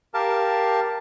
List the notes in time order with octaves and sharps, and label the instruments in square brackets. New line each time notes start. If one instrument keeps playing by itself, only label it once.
[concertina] G4 A#4 F5 A5